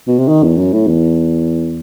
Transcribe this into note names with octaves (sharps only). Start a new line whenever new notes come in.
B2
C3
D#3
E2
F#2
A2
E2